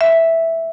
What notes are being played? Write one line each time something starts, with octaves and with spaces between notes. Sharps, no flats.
E5